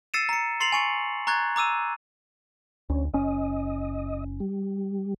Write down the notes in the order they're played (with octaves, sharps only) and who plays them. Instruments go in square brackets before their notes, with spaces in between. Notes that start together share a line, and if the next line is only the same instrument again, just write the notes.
[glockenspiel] E6 A6 C7 C#7 D#7 E7
A#5 C#7
C6 A6 C7 C#7 F7 F#7
G#5 C#6 C#7
A#5 C#6 F#6 G#6 A6
A#5 D6 E6 D#7
[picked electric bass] D2 [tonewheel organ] C#4
[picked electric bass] F#1 C#4 [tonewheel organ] D#5
[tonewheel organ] G3